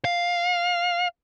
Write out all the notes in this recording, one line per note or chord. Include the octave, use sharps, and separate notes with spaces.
F5